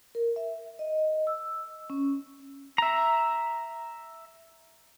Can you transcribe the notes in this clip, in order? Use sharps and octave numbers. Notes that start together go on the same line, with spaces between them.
A#4
E5
D#5
E6
C#4
E5 A#5